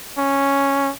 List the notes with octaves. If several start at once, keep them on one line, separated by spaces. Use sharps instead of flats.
C#4